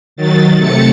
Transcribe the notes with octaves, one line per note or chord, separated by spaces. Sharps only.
D#3 F#3 A6
C3 A3 A6 C#7